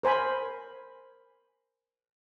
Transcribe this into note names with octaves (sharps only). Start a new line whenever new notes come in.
A#4 C5 G#5 B5